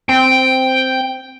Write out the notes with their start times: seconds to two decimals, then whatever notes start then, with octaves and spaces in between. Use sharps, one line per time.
0.09 C4 G5